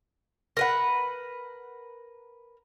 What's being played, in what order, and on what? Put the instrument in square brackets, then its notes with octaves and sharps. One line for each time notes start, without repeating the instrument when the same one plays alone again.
[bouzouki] A#4 B4 F#5